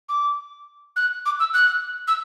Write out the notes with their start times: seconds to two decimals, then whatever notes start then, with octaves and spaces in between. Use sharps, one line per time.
0.09 D6
0.96 F#6
1.26 D6
1.40 E6
1.54 F#6
2.08 E6